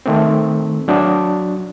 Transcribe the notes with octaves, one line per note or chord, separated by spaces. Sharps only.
D#3 A3 C4
F#3 D4 F#4